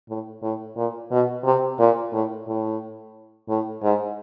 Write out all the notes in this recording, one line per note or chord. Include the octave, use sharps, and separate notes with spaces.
A2
A2
A#2
B2
C3
A#2
A2
A2
A2
G#2